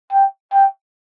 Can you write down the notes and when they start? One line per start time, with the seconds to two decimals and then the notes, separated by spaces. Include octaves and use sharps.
0.12 G5
0.53 G5